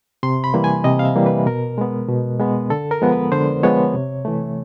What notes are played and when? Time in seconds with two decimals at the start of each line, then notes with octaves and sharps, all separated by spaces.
0.23 C3 C6
0.44 B5
0.54 E3 G3 A#3
0.64 G#5
0.84 C3 D#5
0.99 F5
1.05 E5
1.16 E3 G3 A#3
1.26 B4
1.46 B2 A#4
1.78 G#3 B3
2.08 B2
2.40 G#3 B3
2.70 D3 A4
2.91 A#4
3.02 F3 G#3 B3
3.12 B4
3.32 D3 C5
3.63 F3 G#3 B3 C#5
3.94 C3
4.25 E3 A3